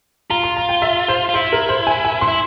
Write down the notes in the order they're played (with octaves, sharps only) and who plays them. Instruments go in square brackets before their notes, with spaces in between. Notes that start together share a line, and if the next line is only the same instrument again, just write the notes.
[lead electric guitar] F4 [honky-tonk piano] A#5
[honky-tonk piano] C6
A#5
G5
E5
C5
[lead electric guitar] F4
[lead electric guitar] E4 [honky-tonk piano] C5
[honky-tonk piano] A#4
C5
G#5
G#5
C6
[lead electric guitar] E4